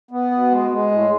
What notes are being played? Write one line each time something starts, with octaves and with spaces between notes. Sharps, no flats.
B3
B2
G#3
G#3
A2